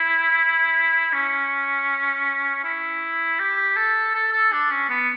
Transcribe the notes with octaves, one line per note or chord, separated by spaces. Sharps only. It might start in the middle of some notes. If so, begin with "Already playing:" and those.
Already playing: E4
C#4
E4
G4
A4
A4
A4
D4
C#4
B3